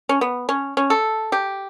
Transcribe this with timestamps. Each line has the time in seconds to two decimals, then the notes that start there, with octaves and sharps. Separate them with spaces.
0.09 C#4
0.21 B3
0.49 C#4
0.77 C#4
0.90 A4
1.32 G4